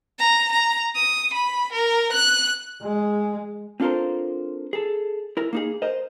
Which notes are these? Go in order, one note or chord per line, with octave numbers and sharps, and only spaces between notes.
A#5
A#5
D#6
B5
A#4
F#6
G#3
C4 D4 F4 A4 A#4 C5
G#4 A4
E4 A#4
A#3 D#4 G#4
A#4 C5 D#5